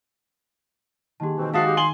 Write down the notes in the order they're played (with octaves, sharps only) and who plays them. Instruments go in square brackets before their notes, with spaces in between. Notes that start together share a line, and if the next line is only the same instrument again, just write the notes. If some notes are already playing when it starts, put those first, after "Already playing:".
[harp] D#3 A#3 G#4 [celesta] G4 A5
[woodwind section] B2 E3 C4
[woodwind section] F3 E5 A5 [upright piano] G#3 F#4 [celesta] F5 D#6 C7
[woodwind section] G4
[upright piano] G#5 F#7 G7 [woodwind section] C6